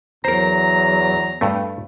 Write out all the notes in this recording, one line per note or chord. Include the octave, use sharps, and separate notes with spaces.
E2 F#3 A#4 C5 A#5
G2 A3